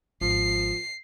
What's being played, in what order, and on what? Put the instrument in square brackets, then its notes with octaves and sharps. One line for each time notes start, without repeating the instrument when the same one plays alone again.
[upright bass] G#1 [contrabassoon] F3 [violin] C7